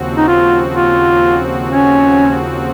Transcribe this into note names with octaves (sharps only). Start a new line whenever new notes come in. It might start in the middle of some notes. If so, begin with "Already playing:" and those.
Already playing: D#2 C#3 F3 C4 F#4
D#4
F4
F4
C#4